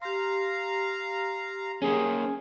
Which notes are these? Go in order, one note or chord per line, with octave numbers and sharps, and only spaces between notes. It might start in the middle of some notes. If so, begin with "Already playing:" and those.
G4 F5 A#5 C6
D#3 A#3 C#4 G#4